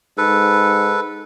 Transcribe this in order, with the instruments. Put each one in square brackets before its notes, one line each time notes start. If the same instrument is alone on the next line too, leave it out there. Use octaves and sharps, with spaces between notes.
[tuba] G#2 [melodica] A4 B4